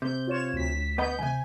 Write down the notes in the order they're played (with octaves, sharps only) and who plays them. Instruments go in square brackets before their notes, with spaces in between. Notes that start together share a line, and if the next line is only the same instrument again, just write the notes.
[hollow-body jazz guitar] C3 [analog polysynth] G6
[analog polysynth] F4 C#5 E7
D2 B6
[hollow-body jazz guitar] B3 D#5 B5 [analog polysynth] G6
[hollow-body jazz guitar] B1 C3 [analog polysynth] G#5